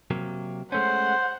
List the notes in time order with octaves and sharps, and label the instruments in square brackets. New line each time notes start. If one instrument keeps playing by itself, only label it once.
[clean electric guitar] C3 F#3 A#3
[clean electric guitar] G#3 A3 C#4 [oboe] C5 [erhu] F#5